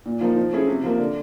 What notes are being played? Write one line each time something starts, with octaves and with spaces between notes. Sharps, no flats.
A#2
F3 A#3 D#4
F3
A3 C#4 E4 G#4
C3
F3 A#3
D3